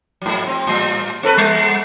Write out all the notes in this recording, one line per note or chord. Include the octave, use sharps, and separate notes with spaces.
G#2 F#3
C4
A2 G3
C4 A4 B4
G3